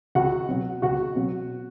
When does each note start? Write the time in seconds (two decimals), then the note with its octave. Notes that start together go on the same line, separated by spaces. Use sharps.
0.15 C#2 F#4 F#5
0.49 B2 F#3
0.82 C#2 F#4 F#5
1.15 B2 F#3